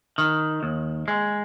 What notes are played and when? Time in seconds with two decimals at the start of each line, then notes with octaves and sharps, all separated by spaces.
0.18 D#3
0.63 D#2
1.08 G#3